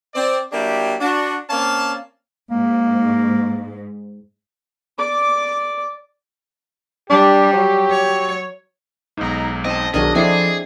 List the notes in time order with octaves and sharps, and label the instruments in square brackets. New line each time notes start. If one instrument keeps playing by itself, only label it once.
[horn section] C4 D5
F#3 A#3 D4 E4 G4
D4 F#4
A#3 C4 C#4 D5 F5 A5
[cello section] G#2 [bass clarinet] A#3
[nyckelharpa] D5 D6
[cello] G3 [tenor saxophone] D4 [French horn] G4
[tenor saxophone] F#3
[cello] C#5
[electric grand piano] B1 G#2 [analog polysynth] D#4 A#5
[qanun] C4 [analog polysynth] D#4 A5 [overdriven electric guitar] D#5
[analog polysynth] B1 D#3 F#3 [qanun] D4 G#4 G#5 [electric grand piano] A#4 [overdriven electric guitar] D#5
[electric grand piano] F3 A4 C7 [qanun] C4 E4 [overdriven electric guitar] G#4 [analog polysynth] D5 D#5